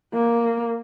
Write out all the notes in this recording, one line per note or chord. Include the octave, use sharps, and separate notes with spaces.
A#3